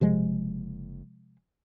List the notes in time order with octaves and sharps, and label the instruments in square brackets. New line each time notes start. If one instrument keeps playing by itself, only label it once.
[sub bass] F#1 [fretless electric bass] C3 F3 G#3